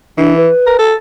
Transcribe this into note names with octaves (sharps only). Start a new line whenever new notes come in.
E3 D4
B4
A#4
A4